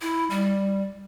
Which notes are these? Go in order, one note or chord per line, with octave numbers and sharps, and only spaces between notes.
E4
G3